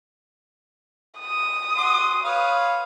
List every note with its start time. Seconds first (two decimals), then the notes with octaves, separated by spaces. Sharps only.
1.20 D#6
1.77 F#4 C6
2.25 B4 C#5 F5